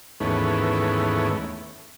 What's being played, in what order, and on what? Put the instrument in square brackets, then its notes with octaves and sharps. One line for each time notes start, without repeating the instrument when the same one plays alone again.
[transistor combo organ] D#2 G#2 E3 A3 B3 C#4